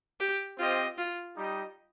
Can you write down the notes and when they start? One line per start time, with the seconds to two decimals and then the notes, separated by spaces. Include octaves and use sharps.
0.20 G4
0.58 C4 F4 G4 C5 D#5
0.98 F4
1.36 G3 D#4 G4 D#5